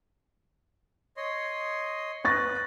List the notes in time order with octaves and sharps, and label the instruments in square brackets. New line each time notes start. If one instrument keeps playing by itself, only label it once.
[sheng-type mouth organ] C#5 D#5 C6
[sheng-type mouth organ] B4 [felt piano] C#6 A6 A#6